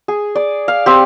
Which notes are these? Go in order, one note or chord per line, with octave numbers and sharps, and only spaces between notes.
G#4
D5
F5
C4 G4